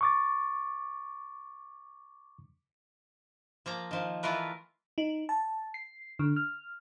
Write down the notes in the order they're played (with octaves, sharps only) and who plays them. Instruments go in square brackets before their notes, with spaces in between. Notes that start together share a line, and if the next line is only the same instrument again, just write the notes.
[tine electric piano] C#6 D6 A6
[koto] F3 A#3 A#5
D#3 F3
E3 A3 F4 A#4 B4
[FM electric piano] D#4
A5
C7
D3
F6